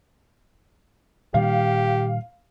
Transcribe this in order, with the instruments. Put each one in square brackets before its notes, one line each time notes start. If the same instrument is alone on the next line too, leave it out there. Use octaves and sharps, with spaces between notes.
[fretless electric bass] A#2 D#3 G3 [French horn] G4 [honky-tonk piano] F5